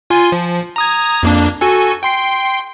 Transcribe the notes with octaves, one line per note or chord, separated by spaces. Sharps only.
F4 G#5 C6
F3
A#5 D#6 G#6
F2 A#3 D4
F#4 A4 G#5
G5 C6 C7